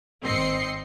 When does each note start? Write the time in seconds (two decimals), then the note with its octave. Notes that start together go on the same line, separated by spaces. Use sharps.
0.23 G#1 C4 D#5 C6 C7 C#7